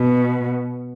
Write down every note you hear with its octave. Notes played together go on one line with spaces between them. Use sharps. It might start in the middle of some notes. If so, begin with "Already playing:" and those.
Already playing: B2